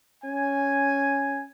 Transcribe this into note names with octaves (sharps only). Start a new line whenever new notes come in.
C#4 G#5